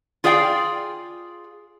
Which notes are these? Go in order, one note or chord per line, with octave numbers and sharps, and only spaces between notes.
F4 G#4 D5 F5 G5